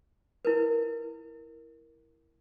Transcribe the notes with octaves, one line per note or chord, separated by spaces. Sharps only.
E4 A#4 B4